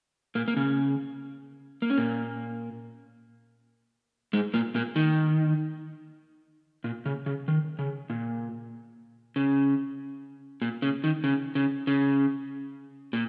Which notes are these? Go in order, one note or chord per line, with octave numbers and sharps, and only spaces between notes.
A#2 A#3
A#3
C#3 C#4
A#3
C#4
A#2 A#3
G#2 G#3
A#2 A#3
A#2 A#3
D#3
A#2
C#3
C#3
D#3
C#3
A#2
C#3
A#2
C#3
D#3
C#3
C#3
C#3
A#2